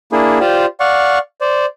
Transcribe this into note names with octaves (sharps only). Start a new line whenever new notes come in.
A#3 D4 E4 G#4
F4 G4 C5 D5
D5 F5 F#5 C#6
C5 D5